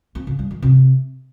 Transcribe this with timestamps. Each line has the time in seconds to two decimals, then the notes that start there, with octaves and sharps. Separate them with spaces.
0.15 C4
0.27 C#3
0.39 G3
0.51 D#3
0.62 C3